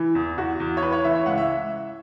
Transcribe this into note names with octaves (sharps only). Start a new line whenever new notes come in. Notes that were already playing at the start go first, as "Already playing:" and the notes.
Already playing: E3 E4
E2
E2 F#4
E2
C#5
E3 B4
C#5
E3 E5
C#5
C#2 F#5
E5